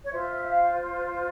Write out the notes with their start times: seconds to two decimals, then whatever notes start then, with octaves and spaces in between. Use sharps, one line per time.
0.06 C#5
0.11 F4 C5 E5
0.30 E5
0.41 E5
0.48 F5